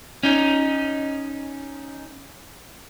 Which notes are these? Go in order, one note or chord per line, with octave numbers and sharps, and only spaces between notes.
C#4 D#4